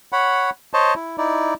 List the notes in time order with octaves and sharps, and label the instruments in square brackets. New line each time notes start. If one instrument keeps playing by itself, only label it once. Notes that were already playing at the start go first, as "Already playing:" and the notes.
[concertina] C#5 F#5 B5
C5 C#5 D#5 A5
E4
D#4 E4 D5